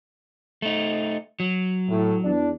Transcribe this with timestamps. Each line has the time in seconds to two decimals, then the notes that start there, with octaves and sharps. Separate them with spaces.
0.62 A3 D#4
1.40 F#3
1.89 A2
2.24 E2 D4 D5